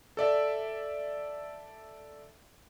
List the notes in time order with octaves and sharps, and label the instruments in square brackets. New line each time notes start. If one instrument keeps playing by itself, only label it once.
[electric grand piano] A4 D5 E5